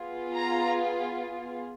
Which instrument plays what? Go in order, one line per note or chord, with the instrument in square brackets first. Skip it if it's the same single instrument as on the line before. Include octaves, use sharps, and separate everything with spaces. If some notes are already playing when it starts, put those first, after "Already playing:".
Already playing: [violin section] B3 F4 G#4
A#5